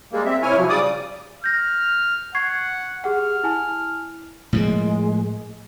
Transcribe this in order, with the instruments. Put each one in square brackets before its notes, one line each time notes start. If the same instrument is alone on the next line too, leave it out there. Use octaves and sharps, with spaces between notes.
[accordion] G3 G#3 A#3
C4 E5
C3 E4 C#5 G#5 F6
C3 F3 F#3
C#3 G3 D5 D6 D#6
[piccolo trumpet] F6 [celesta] G6 A#6
[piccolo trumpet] F#5 [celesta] C#6 G#6 C7
[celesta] G4 G#4 F#5 [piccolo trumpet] F6
[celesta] E4 G#5 A5
[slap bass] A2 F3 A#3 [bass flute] G#3